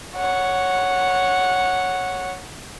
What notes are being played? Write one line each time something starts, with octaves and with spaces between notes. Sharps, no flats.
C#5 F#5